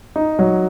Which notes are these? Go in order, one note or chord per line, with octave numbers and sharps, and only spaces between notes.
D#4
F#3